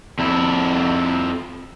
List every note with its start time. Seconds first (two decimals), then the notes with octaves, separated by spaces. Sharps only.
0.19 F2 E4